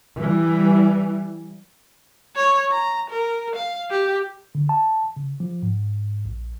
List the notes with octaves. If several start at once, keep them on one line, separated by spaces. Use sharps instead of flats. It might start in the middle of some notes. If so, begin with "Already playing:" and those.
E3 G3
C#5
A#5
A#4
F5
G4
D3
A5
C#3
F3
G#2
A#1